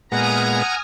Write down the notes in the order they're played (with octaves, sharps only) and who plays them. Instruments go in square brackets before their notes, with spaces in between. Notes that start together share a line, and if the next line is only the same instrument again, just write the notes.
[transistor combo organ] A#2 G#3 B3 [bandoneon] F#5 [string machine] G#5 D#6 F6 [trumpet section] A#5